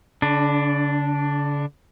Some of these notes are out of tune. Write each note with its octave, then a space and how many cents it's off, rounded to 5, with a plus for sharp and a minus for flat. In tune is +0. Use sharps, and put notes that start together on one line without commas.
D3 -45 D4 +0